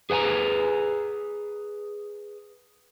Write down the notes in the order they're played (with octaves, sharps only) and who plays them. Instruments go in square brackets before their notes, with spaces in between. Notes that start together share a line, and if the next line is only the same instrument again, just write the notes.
[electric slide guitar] G#4 B4 F#5 G#5 A#5